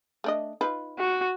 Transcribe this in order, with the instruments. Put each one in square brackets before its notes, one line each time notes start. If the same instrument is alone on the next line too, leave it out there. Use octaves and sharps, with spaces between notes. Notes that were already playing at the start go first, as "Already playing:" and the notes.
[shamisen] A3 D4 D#5
D#4 F4 B4
[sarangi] F#4